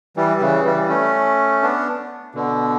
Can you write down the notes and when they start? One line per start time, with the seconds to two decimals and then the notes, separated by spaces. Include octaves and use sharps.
0.17 E3 G3
0.41 C#3 E3
0.65 E3 G3
0.89 A3 C#4
1.62 B3 D4
2.35 B2 D3